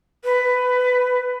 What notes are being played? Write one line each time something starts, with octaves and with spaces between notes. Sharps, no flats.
B4